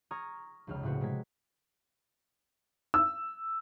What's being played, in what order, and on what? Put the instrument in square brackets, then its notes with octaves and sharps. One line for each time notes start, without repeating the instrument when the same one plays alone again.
[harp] A#5 C#6 D#6 F6 G#6
F1 C#2 F6
A2 C#3 B3 C4 F#4
C3 G#3 A#3 G#6 B6
[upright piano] E6